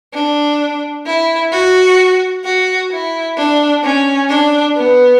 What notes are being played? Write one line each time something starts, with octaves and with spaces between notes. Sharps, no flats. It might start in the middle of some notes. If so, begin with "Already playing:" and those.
D4
E4
F#4
F#4
E4
D4
C#4
D4
B3